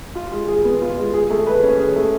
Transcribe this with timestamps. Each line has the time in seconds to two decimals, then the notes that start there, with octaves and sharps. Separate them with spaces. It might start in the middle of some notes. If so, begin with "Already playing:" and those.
0.15 F4
0.32 G#3
0.48 G#4
0.64 B3
0.81 F4
0.97 G#3
1.13 G#4
1.30 A3
1.47 B4
1.63 C#4
1.79 G#4
1.96 A3